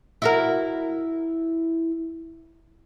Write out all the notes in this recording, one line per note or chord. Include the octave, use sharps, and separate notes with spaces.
E4 F#4 A#4